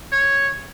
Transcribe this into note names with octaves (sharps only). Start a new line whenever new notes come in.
C#5